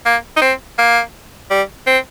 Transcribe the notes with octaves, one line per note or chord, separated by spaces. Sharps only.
A#3
D#4
C4
A#3
G3
C4